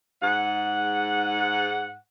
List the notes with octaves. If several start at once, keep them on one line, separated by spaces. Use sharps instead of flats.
G#2 F#5